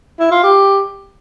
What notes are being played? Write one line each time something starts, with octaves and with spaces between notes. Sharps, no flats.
E4
F4
G4